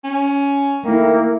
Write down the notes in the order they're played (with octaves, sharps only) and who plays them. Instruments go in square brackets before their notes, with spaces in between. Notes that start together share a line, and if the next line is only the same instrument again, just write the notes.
[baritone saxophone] C#4
[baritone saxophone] D#3 [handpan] A3 E4 [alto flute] A#3